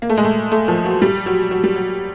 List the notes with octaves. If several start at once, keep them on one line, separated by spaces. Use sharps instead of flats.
A#3
A3
G#3
A3
A3
F3
F#3
G3
F#3
F#3
G3
F#3